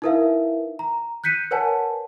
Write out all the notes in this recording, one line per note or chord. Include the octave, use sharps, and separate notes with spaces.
D#4 E4 A#4 B4 E5 F5
A#5
F#6 G6 B6 C#7 D#7
A#4 B4 C#5 F#5 G#5 A5